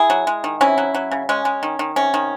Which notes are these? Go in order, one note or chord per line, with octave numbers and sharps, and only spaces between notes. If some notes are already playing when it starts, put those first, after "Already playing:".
Already playing: E4 G#4
F#3
G#3
D#3
C3 C#4 E4
F#3
F#3
C#3
G#3 C#4
G#3
D#3
D#3
C3 C#4
D#3